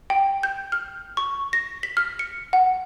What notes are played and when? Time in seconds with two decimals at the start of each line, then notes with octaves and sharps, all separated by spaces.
0.10 G5
0.43 G6
0.72 F6
1.17 C#6
1.53 A#6
1.83 B6
1.97 F6
2.19 C#7
2.53 F#5